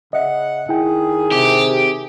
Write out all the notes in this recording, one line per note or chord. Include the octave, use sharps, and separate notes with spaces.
C#3 D#5 E5 F#5
D#3 E4 G#4 G5
C3 G4